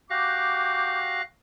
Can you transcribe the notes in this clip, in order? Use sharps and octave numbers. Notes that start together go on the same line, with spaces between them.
F#4 G4 F5 D6 F#6 G6 A#6